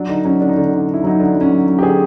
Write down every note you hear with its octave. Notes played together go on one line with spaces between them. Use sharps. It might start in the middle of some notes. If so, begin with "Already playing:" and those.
Already playing: F#3 D4
D3 D#4
F#3 C#4
D3 D4
D#4
D3 D4
D3
D3
E4
F#3 D#4
D3 D4
F#3
C#4
F#3
F#3
G4
D3 G#4